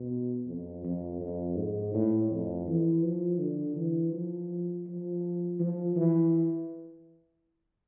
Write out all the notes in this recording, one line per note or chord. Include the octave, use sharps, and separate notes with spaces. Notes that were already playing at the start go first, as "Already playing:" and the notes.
Already playing: B2
F2
F2
F2
G#2
A2
F2
E3
F3
D3
E3
F3
F3
F3
E3